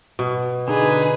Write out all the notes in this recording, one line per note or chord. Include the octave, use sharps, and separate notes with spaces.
B2
D3 D#4 G#4 B4